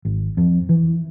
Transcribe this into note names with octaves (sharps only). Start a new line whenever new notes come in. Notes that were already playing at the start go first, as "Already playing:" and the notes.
G#1
F2
E3